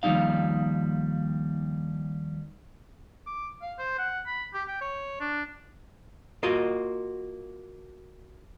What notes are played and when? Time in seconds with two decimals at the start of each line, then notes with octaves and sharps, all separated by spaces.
0.03 D#2 F3 G3 D#4 F5
3.27 D6
3.62 F5
3.79 C5
3.98 F#5
4.27 B5
4.54 G4
4.68 G5
4.81 C#5
5.20 D4
6.43 A#3 F4 F#4 D#5